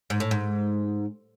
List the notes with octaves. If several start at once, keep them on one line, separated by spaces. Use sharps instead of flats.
G#2
A2
G#2